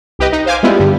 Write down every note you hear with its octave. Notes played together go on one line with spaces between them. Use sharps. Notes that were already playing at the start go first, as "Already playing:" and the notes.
C2 G4 B4 D#5
D#4
C5 F5 G#5 D6
G3 G#3 B3 E4 F4
G2 D3 G3